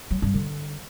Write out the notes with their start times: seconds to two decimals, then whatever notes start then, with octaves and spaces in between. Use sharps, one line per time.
0.11 F#3
0.22 G2
0.34 D3